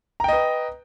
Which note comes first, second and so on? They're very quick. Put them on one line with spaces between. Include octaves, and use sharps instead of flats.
A#5 G5 D#5 B4